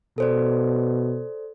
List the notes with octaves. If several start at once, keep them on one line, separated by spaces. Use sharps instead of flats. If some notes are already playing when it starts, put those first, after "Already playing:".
B2 A4 C5 D5